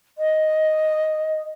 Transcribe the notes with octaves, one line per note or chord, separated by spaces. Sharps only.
D#5